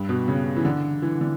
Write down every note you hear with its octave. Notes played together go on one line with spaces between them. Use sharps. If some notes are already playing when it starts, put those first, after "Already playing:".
Already playing: G2
B2
C#3
E3
D3
E3
D3